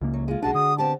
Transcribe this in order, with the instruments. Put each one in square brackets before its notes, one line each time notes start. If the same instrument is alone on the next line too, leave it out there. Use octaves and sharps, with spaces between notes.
[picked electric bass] C#2 C#3 A#3
[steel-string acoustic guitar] F#3
G#3 F4
[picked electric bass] B1 D4 [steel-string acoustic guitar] G#3 F#4 G#4 [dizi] A5
[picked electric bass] D3 [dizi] D#6
[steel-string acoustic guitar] B3 C4 G4 [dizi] A5